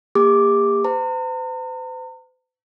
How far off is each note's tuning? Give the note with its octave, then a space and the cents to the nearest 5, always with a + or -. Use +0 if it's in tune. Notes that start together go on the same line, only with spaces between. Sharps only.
A#3 -5 G4 +40 D6 +0
C5 -45 A#5 -40